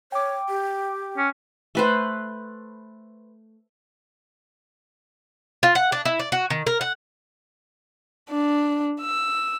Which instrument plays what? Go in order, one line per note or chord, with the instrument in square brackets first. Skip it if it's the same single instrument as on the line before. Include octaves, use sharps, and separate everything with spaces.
[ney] C#5 [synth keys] G5 D6
[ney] G4
[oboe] C#4
[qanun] A3 B4 C5
[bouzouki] F4
F#5
D4
E4
D5
F#4
D#3
A#4
F#5
[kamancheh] D4
E6